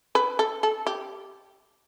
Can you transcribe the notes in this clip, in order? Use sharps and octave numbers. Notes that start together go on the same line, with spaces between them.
B4
A4
A4
G4